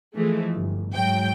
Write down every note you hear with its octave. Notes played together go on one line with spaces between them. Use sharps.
E3 F3 G#3 A3
G1
G#2 F#3 G5